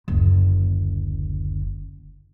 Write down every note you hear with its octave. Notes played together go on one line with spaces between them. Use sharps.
F#1 D2